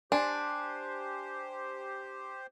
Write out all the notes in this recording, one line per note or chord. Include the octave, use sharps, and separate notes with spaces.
D4 G4 C5 G#5 C6